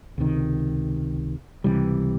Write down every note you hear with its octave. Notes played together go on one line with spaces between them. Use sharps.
C#2 C3 D#3
C#2 C3 E3 G3